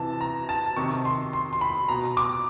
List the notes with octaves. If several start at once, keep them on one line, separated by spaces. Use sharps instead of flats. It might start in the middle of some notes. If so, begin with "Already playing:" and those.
Already playing: C3 E3 A5
A#5
A5
C3 D#3 C#6
C6
C6
C6
B5
B2 A#5
D6